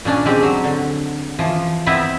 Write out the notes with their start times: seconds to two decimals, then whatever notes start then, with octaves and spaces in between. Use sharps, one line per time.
0.05 A#2 C#4 D4
0.25 G#3 C4 G4
0.43 F#3
0.64 D3
1.39 E3 F3
1.86 B3 C4 E4 B4 E5